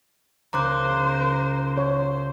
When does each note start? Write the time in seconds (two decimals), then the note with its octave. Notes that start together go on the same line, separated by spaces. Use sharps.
0.53 C#2 A#4 C5 A#5 D6 F#6
1.77 C5 C#5